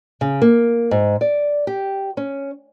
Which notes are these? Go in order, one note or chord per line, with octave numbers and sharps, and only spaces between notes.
C#3
A#3
G#2
D5
G4
C#4